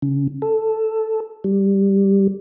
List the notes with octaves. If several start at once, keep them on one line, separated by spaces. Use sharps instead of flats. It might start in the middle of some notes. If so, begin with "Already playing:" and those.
C#3
A4
G3